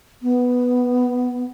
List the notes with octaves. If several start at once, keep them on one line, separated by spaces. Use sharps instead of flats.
B3